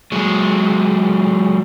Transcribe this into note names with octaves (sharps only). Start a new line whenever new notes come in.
F#3 G#3